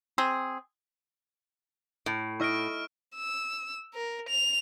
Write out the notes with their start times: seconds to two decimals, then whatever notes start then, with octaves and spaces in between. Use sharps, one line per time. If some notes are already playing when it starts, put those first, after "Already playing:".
0.18 C4 G#4
2.06 A2
2.40 E4 D#5 C#6 F6 D7
3.16 E6
3.94 A#4
4.29 F7